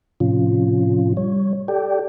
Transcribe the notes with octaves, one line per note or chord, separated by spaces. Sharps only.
A2 C3 F3 C#4 F4
G3 C#5
G4 A4 D5 G5